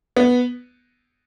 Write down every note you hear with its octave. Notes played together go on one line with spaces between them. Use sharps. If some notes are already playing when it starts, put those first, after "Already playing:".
B3